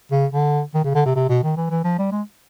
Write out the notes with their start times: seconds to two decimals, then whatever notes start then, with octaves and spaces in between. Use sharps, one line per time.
0.12 C#3
0.32 D3
0.74 D#3
0.84 C#3
0.95 D3
1.05 C3
1.16 C3
1.29 B2
1.44 D#3
1.57 E3
1.70 E3
1.84 F3
1.98 G3
2.12 G#3